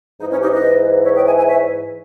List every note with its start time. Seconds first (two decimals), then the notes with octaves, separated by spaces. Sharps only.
0.20 G#2 E3 D#4
0.31 C#4 E4
0.41 D#4 G4
0.52 B4 D#5
1.05 C#5 E5
1.16 D#5 G5
1.26 E5 G#5
1.37 E5 G#5
1.48 C#5 E5